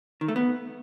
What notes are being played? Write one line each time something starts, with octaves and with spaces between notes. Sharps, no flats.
D#3
A3
B3